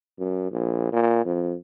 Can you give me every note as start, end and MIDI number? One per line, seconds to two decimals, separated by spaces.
0.19 0.48 42
0.51 0.90 34
0.92 1.22 46
1.25 1.56 41